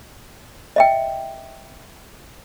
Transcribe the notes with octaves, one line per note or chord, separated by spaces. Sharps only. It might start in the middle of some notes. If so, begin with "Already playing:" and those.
D#5 E5 G5